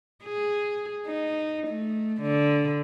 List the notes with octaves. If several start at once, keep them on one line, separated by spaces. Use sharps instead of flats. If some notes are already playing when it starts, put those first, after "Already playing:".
G#4
D#4
A3
D3